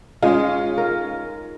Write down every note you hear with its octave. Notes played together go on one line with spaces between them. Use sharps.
G#3 C#4 D#4 F4
A#4